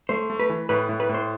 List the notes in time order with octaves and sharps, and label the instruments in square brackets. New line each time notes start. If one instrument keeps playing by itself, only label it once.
[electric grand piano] A3 [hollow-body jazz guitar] C5
[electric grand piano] A3
[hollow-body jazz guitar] B4
[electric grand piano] E3
[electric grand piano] A2 [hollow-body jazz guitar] B4
[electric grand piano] A2
[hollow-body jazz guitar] B4
[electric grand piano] A2
[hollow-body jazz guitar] C5